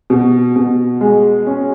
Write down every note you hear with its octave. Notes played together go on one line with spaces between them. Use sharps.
B2
B2
G#3
C#4